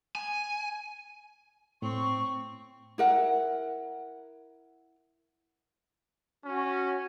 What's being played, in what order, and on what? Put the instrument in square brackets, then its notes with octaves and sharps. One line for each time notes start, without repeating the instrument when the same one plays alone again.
[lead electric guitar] G#5
[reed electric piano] A2 [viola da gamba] C4 [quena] C#6
[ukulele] E4 A#4 F#5
[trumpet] C#4 [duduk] F#4